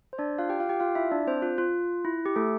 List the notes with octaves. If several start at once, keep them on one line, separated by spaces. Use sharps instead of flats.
C5
D4 D5
F4 F5
G4 G5
F4 F5
G4 G5
F4 F5
E4 E5
D4 D5
C4 C5
F4
F4
E4
G4
A3 A4